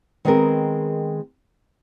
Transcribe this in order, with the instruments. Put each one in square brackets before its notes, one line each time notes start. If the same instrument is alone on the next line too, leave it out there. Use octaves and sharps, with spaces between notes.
[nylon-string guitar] D#3 G#3 B3 C4 G#4 A#4